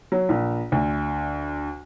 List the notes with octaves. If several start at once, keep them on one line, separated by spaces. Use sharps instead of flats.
F#3
A#1
D2